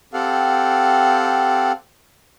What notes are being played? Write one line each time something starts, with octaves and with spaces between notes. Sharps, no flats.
C4 G4 A4 F5 F#5